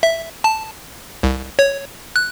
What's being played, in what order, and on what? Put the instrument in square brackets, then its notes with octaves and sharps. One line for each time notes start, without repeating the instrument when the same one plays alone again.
[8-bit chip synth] E5
A5
C2
C#5
F#6